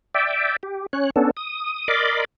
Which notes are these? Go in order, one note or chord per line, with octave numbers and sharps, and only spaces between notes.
D5 E5 G5
G4
C#4 C#5 F#6
B3 C#4 D4 A4
D#6
A#4 D5 D#5 B5 C6 D6